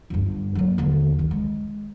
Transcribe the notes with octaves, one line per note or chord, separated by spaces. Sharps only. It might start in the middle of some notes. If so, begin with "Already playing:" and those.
G1 G2
F#3 A#3
D#2 D3
D#3
G#3